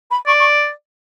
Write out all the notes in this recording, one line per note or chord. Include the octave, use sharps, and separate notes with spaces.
B5
D5 C#6
C#6